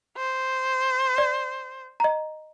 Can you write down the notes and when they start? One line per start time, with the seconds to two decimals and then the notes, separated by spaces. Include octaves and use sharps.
0.17 C5
1.18 D5
2.00 D#5 A#5